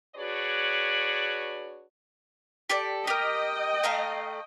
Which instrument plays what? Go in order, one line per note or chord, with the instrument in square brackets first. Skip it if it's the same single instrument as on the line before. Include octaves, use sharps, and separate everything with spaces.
[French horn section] D4 F#4 G#4 B4 C#5 D5
[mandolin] G4 A4 D5
[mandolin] G4 A#4 [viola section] D#5 G5
[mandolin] A3 F5 A#5